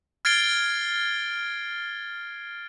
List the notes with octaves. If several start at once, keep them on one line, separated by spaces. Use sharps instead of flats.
F6 G#6 A6 C7 D7 G7